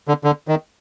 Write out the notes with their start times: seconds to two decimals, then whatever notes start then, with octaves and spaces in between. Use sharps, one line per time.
0.08 D3
0.24 D3
0.48 D#3